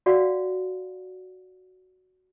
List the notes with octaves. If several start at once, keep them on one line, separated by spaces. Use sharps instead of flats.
F#4 D5 F5 F#5